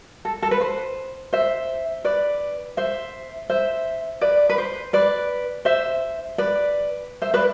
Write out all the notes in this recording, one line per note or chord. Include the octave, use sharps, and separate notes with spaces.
A4
A4
B4
C5
C5 E5
B4 D5
C5 E5
C5 E5
B4 D5
B4
C5
B4 D5
C5 E5
B4 D5
C5 E5
B4 D5